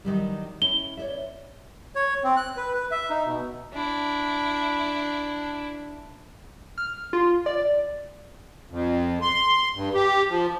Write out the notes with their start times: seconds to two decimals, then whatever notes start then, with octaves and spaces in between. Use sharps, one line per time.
0.05 D#3 F#3 G3
0.62 C#4 E4 G7
0.97 C#5 D5 E5
1.95 C#5
2.24 C4
2.37 F#6
2.57 B4
2.74 B4
2.91 E5
3.10 D#4
3.26 B2
3.73 D4 E4
6.78 F6
7.13 F4
7.46 D5
8.70 F2
9.22 C6
9.75 G2
9.94 G4
10.29 F3